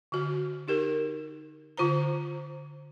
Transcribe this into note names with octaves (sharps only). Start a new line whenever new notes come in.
D3 F#4
D#4 G4 A#4
D3 F4 C5 A#5